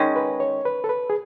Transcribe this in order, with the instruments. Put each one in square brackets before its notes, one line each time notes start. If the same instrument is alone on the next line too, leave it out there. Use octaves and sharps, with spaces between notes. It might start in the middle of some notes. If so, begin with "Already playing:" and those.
Already playing: [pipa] D#3 G#3 C#4
[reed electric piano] B4
C#5
B4
A4
B4
G#4